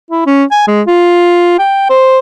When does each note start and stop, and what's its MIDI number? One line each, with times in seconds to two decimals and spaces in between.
0.11 0.26 64
0.26 0.44 61
0.52 0.64 80
0.67 0.82 56
0.87 1.57 65
1.59 1.90 79
1.90 2.19 72